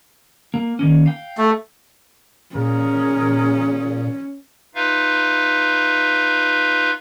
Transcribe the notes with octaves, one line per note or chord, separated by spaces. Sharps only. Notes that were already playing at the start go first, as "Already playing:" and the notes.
A#3
D#3 A#3 C#4
F5 G5
A3
A#2 C#4 G#4 A#4
D#4 F4 B4 E5 F5